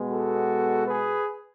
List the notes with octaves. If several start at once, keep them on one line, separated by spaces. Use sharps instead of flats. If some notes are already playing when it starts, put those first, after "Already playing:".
Already playing: B2 G#3 B3
F#4 A4
G#4 B4